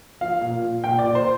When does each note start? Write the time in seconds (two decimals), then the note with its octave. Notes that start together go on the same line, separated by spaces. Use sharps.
0.21 F3 F5
0.41 A#2
0.62 A#2
0.84 A#2 G5
0.99 D5
1.04 A#2
1.15 C5